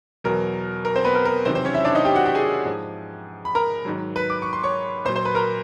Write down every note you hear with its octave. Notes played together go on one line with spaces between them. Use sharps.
E2 B2 F#3 A#4
A#4
C4 C5
B3 B4
A#4
A#4
E2 C3 D#3 F#3 C4 C5
C4 C5
C#4 C#5
E4 E5
D4 D5
D#4 D#5
G4 G5
F#4 F#5
G4 G5
G#4 G#5
G#2 F3
B5
A#4 A#5
G#2 D#3 F#3
B4 B5
D6
C#6
C6
C#5 C#6
A#2 F#3 C5 C6
C5 C6
B4 B5
A#4 A#5